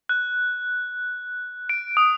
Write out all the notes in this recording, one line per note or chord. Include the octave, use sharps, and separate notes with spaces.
F#6
D7
D#6